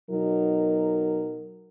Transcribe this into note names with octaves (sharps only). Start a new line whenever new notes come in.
B2 F#3 D#4 A#4